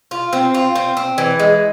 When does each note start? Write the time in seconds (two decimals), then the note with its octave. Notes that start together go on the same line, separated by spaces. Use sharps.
0.11 F4
0.33 C4
0.54 F4
0.75 C4
0.97 C4
1.18 E3
1.39 G#3